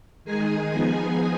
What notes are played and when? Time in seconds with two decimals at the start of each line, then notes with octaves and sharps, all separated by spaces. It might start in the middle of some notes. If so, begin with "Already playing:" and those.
0.24 D#3 G#3 D#4 G#4 G#5
0.70 F3 B3 D#4 G#4 G#5